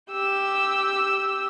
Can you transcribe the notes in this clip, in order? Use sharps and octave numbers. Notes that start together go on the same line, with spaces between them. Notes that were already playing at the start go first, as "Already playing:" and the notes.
G4 E6